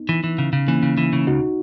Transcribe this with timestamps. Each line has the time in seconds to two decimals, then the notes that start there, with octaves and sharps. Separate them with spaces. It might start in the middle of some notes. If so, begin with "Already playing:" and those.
Already playing: B3 D#4
0.09 E3
0.24 E3
0.38 C#3
0.53 C#3
0.68 E3 A#3 C#4
0.83 C#3
0.97 E3
1.13 C#3
1.27 C#2 D#4 F#4